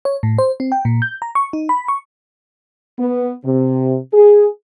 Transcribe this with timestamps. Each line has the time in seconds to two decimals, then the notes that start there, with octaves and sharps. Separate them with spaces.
0.05 C#5
0.23 A2
0.38 C5
0.60 C4
0.72 G5
0.85 A#2
1.02 G6
1.22 A#5
1.35 C#6
1.53 D#4
1.69 B5
1.88 C#6
2.99 B3
3.45 C3
4.14 G#4